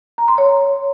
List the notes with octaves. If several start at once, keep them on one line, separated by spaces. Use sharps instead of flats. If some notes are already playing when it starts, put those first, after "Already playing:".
A#5
C6
C#5